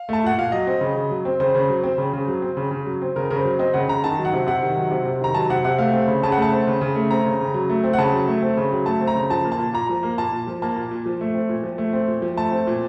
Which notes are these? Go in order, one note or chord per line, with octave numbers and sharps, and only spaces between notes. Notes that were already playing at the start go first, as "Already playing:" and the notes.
Already playing: F5
A3 A5
A#2 F#5
A#2 F5
F#3 D#5
C4
C#3
C#3
F#3
C4
C#3 C5
C#3
F#3
C4
C#3
C#3
F#3
C4
C#3
C#3
F#3
C4
C#3 A#4
C#3 A#4
C5
F#3
C4 D#5
C#3 F#5
C#3 A#5
D#3 A5
F#3
F#5
C3
C3 F#5
D#3
F#3
C3
C3
D#3 A#5
F#3 A5
C3 F#5
C3 F#5
A3 F5
C4
C#3
C#3 A5
F#5
A3
A5
C4
C#3
C#3
A3
C4 A#5
C#3
C#3
F#3
A3
C4
F#5
C#3 A5
F#3
A3
C4
C#3
F#3
A3 A5
C4
A#5
C#3
F3 A5
A#3
A5
A#2
A#2 A#5
F3
A#3
A#2 A5
A#2
F3
A#3 A5
A#2
A#2
F3
A3
C4
A#2
F3
A3
C4
A#2
F3
A3 A5
C4
A#2